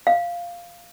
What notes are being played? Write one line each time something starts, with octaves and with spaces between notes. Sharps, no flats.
F5